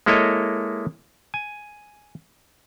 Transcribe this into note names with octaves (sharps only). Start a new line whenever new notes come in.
G#3 A#3 E4 A4 C#5 D#5
G#5